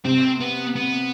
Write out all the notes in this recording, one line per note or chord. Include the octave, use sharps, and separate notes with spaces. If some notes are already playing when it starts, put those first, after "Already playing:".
C3 C4
B3
B3